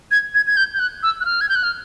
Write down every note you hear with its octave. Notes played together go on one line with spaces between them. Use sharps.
G#6
G#6
G#6
G6
G6
F#6
E6
F#6
F6
G#6
G6
F#6
F6